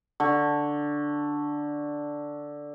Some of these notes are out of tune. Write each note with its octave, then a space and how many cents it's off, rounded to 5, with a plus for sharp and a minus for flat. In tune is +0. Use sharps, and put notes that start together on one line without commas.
D3 +0 C#6 +0